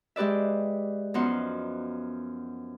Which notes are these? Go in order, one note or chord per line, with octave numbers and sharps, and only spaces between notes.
G#3 G4 B4 D5 E5
F#2 F3 B3 D#4 F#5 C6